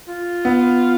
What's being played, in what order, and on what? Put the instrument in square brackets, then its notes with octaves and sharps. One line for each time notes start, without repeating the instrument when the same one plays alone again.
[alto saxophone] F4
[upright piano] B3